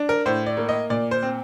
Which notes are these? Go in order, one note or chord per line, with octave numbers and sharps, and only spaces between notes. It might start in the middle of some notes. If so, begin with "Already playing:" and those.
Already playing: D4
A#4
A2 C5
D5
A#3
D#5
A#2 D5
C5
C4